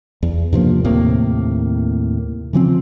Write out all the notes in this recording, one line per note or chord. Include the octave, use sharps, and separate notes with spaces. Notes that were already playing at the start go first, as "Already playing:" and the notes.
E2
G2 C3 F3 A#3
D#2 A2 C3 A#3
C#3 E3 F3 C4